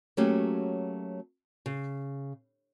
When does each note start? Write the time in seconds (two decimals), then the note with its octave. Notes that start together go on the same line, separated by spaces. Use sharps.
0.17 F#3 A3 A#3 C#4 F#4 G4
1.66 C#3